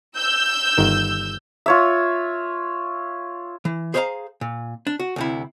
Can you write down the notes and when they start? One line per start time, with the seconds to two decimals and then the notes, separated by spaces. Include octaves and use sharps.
0.17 E6 G6
0.78 G1 D#3 A#4
1.66 F4 C#5 E5
3.65 E3
3.94 G#4 C5 C#5 E5 F5 A#5
4.41 A#2
4.87 D4
4.99 F#4
5.16 D2 C3 E4